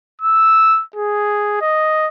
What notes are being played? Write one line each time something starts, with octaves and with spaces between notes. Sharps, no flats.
E6
G#4
D#5